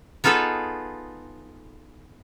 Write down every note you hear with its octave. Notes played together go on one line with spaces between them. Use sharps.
B3 D#4 F4 G#4 A4 B4